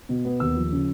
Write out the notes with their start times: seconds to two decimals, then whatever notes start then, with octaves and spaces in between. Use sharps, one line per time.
0.09 B2
0.25 B3
0.40 D#2 E6
0.57 F3
0.72 C#3